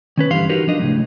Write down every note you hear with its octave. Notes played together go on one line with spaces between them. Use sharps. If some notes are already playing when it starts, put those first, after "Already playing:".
D#3 C#4 B4
G2 D3 E3 G4 F5 C6
D#4 F#4 G4 A#4 B4
F3 D4 D#5
C#2 A2 F#3